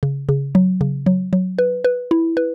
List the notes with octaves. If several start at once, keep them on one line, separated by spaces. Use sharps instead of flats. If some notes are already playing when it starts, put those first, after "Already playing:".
C#3
C#3
F#3
C#3
F#3
F#3
B4
B4
E4
B4